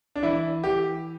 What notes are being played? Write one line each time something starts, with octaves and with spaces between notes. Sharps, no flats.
D4
E3 E4
E3 G4